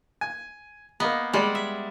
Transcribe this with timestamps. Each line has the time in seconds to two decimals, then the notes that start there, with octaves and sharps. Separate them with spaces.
0.21 G#5
1.00 A#3 B3 D#5 A#5
1.33 G3 G#3 G#4 D5
1.55 E5